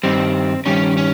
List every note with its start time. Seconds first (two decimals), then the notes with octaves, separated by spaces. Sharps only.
0.03 G2 D#3 G3 C4
0.66 G2 D#3 G3 C#4
0.97 C#4